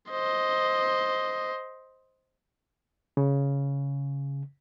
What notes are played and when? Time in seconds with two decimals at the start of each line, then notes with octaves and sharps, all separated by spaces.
0.10 C5 D#5
3.17 C#3